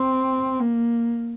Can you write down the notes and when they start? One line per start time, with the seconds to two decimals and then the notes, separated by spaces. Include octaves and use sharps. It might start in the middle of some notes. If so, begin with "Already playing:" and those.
Already playing: C4
0.60 A#3